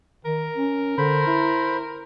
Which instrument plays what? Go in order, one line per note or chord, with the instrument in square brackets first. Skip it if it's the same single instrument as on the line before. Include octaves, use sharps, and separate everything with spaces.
[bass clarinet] D#3 [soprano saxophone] A#4
[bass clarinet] C#4
[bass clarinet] D3 [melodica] C5 B5
[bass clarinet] E4